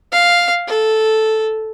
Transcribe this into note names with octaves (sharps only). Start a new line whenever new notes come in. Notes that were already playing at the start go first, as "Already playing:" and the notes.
F5
A4